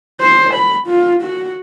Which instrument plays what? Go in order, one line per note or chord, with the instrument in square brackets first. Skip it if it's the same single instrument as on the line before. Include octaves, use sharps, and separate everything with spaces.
[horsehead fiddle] C5
B5
F4
F#4